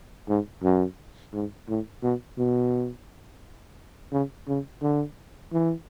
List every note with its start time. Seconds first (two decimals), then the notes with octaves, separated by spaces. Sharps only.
0.29 G#2
0.63 F#2
1.34 G#2
1.68 A2
2.03 B2
2.38 B2
4.12 C#3
4.48 C#3
4.82 D3
5.52 E3